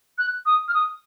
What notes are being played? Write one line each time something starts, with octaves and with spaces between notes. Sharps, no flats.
F#6
D#6
F6
D#6